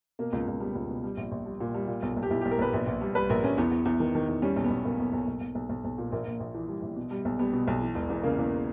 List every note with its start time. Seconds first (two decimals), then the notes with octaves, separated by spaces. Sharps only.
0.19 B2 A#3
0.33 C#2
0.47 C#2
0.60 G3 B3
0.75 C#2
0.90 B2
1.04 G3
1.17 A#1
1.31 A#1
1.46 G3
1.60 A#2
1.74 G3
1.88 A#2
2.02 B1
2.17 B1
2.23 G4
2.31 B1 E4
2.41 B1 G4
2.51 A#4
2.58 B1 B4
2.73 A#1
2.87 A#1
3.01 G3
3.15 G3 B4
3.29 A#1 A#4
3.43 A#1 C#4
3.57 E2 B3
3.71 E2
3.85 E2
4.00 D#3
4.15 D#3
4.28 E2
4.42 G3 C#4
4.56 B1
4.64 B3
4.70 B1
4.85 B1 A#3
5.00 B1
5.13 B1
5.28 B1
5.41 B1
5.55 B1
5.69 B1
5.84 B1
5.98 A#2
6.12 A#1 A#3
6.27 A#1
6.40 A#1
6.54 E3
6.68 G3
6.82 A#1
6.96 B2
7.11 G3
7.25 B1
7.39 G3 B3
7.53 B2
7.68 B1
7.81 E3
7.95 E1
8.10 E2
8.23 C#3 A#3
8.38 E2